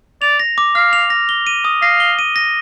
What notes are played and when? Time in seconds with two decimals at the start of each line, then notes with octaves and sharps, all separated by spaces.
0.22 D5 F7
0.40 A#6
0.58 D6
0.75 F5 F6
0.93 F7
1.10 A#6
1.29 G7
1.47 D#7
1.65 D#6
1.82 F5 A#6
2.00 G7
2.19 D#7
2.36 A#6